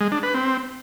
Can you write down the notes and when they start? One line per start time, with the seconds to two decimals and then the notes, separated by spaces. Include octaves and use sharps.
0.01 G#3
0.12 D4
0.23 B4
0.34 C4